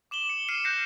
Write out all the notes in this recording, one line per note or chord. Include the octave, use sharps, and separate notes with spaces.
D6 E7 F#7 G7
C#7
F6 C7 C#7 D#7 E7 G7
F#6 G6 A#6 C7 C#7 E7